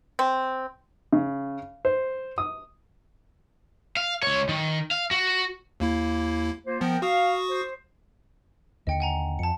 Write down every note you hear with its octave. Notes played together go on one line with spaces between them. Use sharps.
C4
C#3
C5
D#6
F5
C#2 C#5
D#3
F5
F#4
D#2 A#3 E4
A#3 F4 C5
F3 B3 A#4 G5
F#4 F5 C#6 D#6
C5
D#2 D3 D#5 G5 C#7
F#5 G#5 A#5
F2 A5 C#7